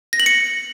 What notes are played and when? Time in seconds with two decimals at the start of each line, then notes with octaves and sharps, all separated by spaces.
0.13 A#6
0.20 F#7
0.26 C#7